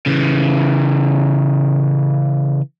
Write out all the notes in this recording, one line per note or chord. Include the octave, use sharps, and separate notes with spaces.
C#3 E3